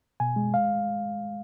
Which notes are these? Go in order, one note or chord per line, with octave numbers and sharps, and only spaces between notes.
B2 G#5
G#3
F5